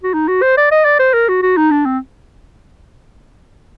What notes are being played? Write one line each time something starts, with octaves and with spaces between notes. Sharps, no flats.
F#4
D#4
F#4
C5
D5
D#5
D5
C5
A#4
F#4
F#4
D#4
D4
C4